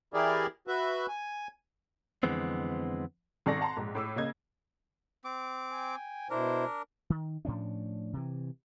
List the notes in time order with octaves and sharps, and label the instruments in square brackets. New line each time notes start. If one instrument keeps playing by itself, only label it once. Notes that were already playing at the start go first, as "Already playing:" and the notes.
[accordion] E3 E4 G4 G#4 A#4 D5
F#4 B4 E5
G#5
[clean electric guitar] F2 D3 E3 G#3 B3 C4
[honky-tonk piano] G#1 D#3 A4 D5 C#6 A#6
F#5 A5 A#5 C6
A#1 G#2
A2 D6 E6
C#3 A#3 D#5 G#6
[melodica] C4 D6
[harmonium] G5 G#5
[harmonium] B2 E4 C5 [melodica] D4 A#4
[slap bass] D#3
A2 F3 C#4 D4
C3 E3